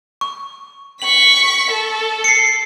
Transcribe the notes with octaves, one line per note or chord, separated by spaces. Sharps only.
C#6
C#6 B6 F#7
A4
C7 C#7